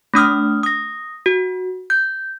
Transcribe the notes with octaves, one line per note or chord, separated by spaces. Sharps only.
A3 D4 D#6 F6
D#6 A#6
F#4
G6